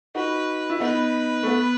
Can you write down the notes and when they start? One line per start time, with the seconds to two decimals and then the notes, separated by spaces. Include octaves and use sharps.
0.15 D#4 F#4 B4
0.70 E4
0.80 B3 D#4 B4
1.43 A3
1.47 B3